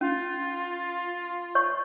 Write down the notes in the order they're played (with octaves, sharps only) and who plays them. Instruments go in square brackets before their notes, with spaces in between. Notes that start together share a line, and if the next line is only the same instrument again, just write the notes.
[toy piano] C#4 [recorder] F4
[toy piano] C#5 C#6